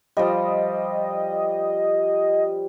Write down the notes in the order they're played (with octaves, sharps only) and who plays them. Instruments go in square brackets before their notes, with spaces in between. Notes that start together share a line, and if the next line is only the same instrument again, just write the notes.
[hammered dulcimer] F3 G3 [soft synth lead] D#5